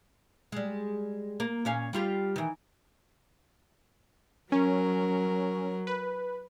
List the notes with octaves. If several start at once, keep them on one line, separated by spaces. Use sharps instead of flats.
G3 G#3
A#3
A#2 C#4 F5
G3 F4 G4
D#3 E3
F#3 C#4 A#4
B4